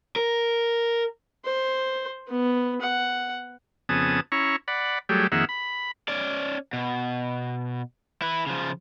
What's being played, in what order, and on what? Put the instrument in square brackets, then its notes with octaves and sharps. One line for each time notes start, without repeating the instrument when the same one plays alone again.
[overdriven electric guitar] A#4
[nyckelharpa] C5
B3
F#5
[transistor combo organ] F2 C#3 B3 G#5 A5 D#6
C#4 E4 A#5 C#6
D5 F#5 B5
F#3 G3 A3 G#4 G5
F2 D#3 A#3 G#4 E5 F#5
B5
[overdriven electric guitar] C#4 D5
B2
E4 B4
C#3 F3